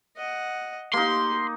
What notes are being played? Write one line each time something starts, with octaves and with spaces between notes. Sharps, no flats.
D#5 F#5
A#3 D#4 G4 C6